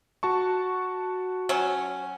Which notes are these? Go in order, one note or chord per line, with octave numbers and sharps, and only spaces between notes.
F#4 A5 C#6
F#3 C#4